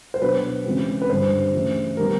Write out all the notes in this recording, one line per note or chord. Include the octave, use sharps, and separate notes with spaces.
C5
B2 F#3 B3 D4 B4
C#3 E3 G#3 C4
B4
G2 D3 G3 C5
C#3 E3 A3
D#3 G3 B3 D#4 A#4